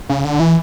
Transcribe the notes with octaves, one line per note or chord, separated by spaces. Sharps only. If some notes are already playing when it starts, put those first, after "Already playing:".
C#3
D3
E3